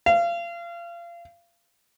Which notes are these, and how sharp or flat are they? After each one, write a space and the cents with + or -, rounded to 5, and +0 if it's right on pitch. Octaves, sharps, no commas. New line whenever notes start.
F5 -30